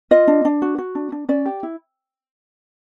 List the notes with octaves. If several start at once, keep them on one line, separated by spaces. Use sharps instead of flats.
F4 D#5
D4
D4
F#4
F#4
D4
D4
C#4 D5
G4
E4